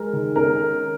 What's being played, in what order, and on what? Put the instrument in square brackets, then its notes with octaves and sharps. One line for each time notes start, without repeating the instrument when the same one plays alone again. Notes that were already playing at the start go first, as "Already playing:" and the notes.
Already playing: [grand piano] G#3 A#4
D#3
C#4 A#4